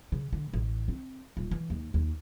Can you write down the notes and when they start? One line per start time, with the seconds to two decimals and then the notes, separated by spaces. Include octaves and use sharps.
0.12 C#3
0.33 D3
0.54 A1
0.88 C4
1.37 D#1
1.51 E3
1.70 D#2
1.94 D#2